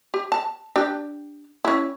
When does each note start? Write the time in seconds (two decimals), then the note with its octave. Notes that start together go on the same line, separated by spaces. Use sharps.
0.14 G4
0.32 A5
0.76 D4 G4
1.65 C#4 E4